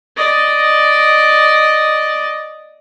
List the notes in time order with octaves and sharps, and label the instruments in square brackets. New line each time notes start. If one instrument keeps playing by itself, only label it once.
[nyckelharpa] D5 D#5